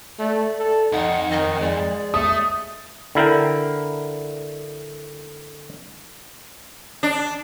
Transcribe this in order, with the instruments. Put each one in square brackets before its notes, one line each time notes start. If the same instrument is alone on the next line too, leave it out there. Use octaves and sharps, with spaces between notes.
[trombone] A3 [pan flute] D5
[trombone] A4
[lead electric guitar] C2 F2 [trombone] D#4 [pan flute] F#5
[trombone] D#3 [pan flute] D#5
[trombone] G#3 [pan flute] D5
[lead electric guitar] A3 [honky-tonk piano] D#6
[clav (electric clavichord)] D3 E4 A#4 G5
[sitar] D4